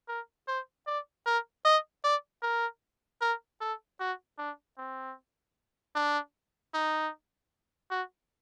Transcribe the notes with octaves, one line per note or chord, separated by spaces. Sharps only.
A#4
C5
D5
A#4
D#5
D5
A#4
A#4
A4
F#4
D4
C4
D4
D#4
F#4